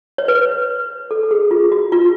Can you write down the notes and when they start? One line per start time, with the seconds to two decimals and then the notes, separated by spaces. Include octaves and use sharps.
0.18 C#5
0.28 B4
1.11 A4
1.23 A4
1.31 G#4
1.51 F4
1.72 F#4
1.92 F4